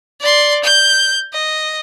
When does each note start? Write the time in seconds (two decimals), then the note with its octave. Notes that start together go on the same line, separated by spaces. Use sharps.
0.21 D5 C6
0.64 G6
1.34 D#5